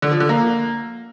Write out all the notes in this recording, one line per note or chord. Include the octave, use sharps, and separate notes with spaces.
D3
F3
D3
A#3